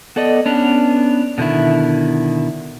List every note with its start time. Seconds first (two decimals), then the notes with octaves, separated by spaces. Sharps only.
0.16 B3 A4 D5 D#5
0.46 B3 C#4 D4
1.38 B2 D3 D#3 E4